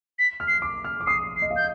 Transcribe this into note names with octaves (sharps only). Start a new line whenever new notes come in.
B6
F6
C7
D6
F6
D6
D#6 C7
C7
D#5
F5
G6